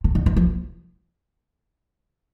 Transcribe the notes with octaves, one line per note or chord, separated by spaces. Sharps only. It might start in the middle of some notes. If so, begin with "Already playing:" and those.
D3
D3
E3
F3